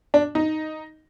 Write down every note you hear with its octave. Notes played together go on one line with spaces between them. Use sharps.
D4
D#4